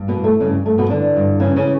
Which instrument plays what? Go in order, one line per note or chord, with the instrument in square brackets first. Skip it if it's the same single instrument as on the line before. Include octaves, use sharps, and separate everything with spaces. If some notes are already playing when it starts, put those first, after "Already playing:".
Already playing: [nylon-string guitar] G2
B2 B3
E3
A3
G2 C#3 C#4
G2 A3
B2 B3
D3 E3 D4
G2
C#3 E3 C#4
C#3 C#4